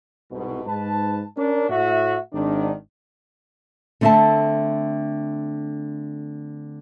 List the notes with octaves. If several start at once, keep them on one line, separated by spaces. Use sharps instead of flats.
C2 G#2 B2
G#2 B4 A5
C#4 D4 A#4
A2 F#4 E5
G#1 D#3 D4
D3 A3 C4 D#5 E5 A5